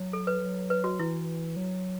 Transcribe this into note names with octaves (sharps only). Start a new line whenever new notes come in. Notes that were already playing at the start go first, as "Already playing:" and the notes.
Already playing: F#3
A4
B4
F#3
B4
F#4
E3 E4
F#3